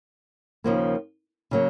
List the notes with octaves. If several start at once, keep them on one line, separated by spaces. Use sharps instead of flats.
D#2 C#3 F3 A#3
C#3 F#3 A#3